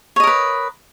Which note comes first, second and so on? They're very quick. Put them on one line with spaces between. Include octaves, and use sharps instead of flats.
C#5 D#5 A#4 B4